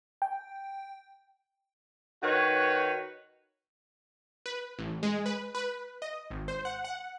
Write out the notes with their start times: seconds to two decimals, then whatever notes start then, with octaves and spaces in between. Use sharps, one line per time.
0.22 G5
2.23 D#3 F#4 B4 C#5
4.46 B4
4.79 A1
5.03 G#3
5.26 B4
5.55 B4
6.02 D#5
6.31 G#1
6.48 C5
6.65 F#5
6.84 F#5